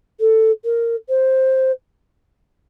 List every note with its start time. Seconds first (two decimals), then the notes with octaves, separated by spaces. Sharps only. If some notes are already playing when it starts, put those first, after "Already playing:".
0.20 A4
0.64 A#4
1.09 C5